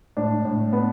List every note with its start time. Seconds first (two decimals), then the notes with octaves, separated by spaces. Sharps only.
0.17 A2 D4
0.45 A2
0.73 B3